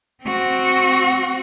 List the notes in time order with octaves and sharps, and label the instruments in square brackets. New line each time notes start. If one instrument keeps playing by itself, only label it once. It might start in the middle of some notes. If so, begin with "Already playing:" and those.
[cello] C4 F#4